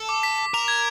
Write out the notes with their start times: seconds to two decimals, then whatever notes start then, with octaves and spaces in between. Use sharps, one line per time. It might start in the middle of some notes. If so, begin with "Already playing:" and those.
Already playing: A4
0.09 D6
0.23 B6
0.38 B6
0.54 A#4 F7
0.68 G#6